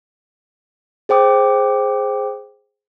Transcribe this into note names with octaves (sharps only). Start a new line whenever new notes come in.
G#4 C5 G5 D6 D#6